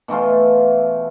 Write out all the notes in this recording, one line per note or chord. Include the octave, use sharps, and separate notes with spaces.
B2 E3 A3 F4